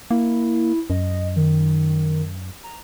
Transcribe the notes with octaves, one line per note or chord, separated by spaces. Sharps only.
A#3 E4
F#2 D#5
D#3
A#5